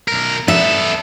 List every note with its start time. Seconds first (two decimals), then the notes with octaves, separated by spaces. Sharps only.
0.08 B1 A#4
0.48 B3 A4 E5